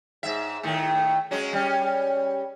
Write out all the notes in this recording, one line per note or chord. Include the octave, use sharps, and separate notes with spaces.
G#2 E5
A2 D#3 A3
F#3 G#3 C#4
G3 C#4